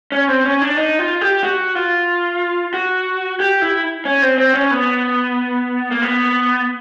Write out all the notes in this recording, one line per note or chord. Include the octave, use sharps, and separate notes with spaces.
C#4
C4
C#4
D4
D#4
F4
G4
F#4
F4
F#4
G4
E4
C#4
C4
C4
C#4
B3
A#3
B3